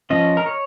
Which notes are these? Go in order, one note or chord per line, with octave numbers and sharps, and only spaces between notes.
F3 C#4 D#5
A#4
C#5